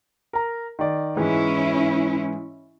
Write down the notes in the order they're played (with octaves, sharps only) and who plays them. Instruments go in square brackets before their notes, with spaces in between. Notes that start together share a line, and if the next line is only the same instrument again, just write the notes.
[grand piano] A#4 A#5
D#3 D5
[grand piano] G#2 E3 G#3 [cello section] C#4 E4